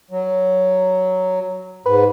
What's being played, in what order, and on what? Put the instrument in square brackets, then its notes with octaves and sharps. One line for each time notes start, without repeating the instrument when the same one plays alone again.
[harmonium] F#3
[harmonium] G#2 [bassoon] B4